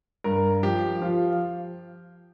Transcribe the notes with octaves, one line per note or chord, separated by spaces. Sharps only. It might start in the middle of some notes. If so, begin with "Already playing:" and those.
G2 A#4
F3 G4
F3 F4